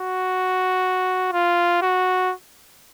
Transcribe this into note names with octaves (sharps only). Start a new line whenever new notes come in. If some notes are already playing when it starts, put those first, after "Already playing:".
Already playing: F#4
F4
F#4